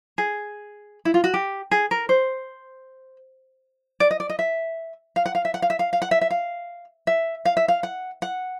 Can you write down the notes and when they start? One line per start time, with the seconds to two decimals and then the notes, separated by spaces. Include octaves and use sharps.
0.18 G#4
1.05 E4
1.14 F4
1.24 F#4
1.34 G4
1.71 G#4
1.91 A#4
2.09 C5
4.00 D5
4.11 D#5
4.20 D5
4.30 D#5
4.39 E5
5.16 F5
5.26 F#5
5.35 F5
5.45 E5
5.54 F#5
5.62 F5
5.70 E5
5.79 F5
5.93 F5
6.02 F#5
6.11 E5
6.21 E5
6.30 F5
7.07 E5
7.45 F5
7.57 E5
7.68 F5
7.83 F#5
8.22 F#5